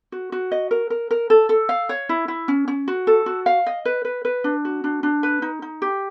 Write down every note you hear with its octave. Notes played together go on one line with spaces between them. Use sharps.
F#4
F#4
D#5
A#4
A#4
A#4
A4
A4
F5
C#5
E4
E4
C#4
C#4
F#4
A4
F#4
F5
D#5
B4
B4
B4
D4
F#4
D4
D4
B4
D#4
D#4
G4